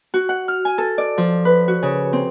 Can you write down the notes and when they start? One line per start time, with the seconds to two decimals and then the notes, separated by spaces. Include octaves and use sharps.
0.14 F#4
0.29 F#5
0.48 F6
0.65 G#5
0.78 A4
0.98 D5
1.18 F3
1.45 B4
1.68 F#4
1.83 C#3
2.13 C4